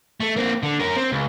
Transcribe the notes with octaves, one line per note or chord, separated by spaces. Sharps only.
A3
A#3 C4
D3
C#4 A#4
C4
C#2